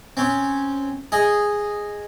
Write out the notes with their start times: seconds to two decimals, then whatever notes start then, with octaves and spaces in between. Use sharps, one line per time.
0.17 C4 C#4
1.12 G#4 D#5